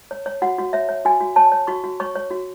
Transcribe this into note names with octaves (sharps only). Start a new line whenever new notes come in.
C#5
C#5
F#4 F#5
F#4
C#5 E5
C#5
F#4 G#5
F#4
C#5 A5
C#5
F#4 C#6
F#4
C#5 C#6
C#5
F#4